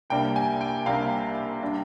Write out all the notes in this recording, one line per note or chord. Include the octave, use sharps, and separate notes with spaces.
C2 C3 G3 A#3 D4 G5
G#5
G5
C2 C3 G3 A#3 D4 F5
G3 D4